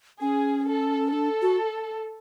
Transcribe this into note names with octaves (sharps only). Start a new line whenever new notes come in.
C#4 G#4
A4
D4 A4
F#4